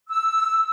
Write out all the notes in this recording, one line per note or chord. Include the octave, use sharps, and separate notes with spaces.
E6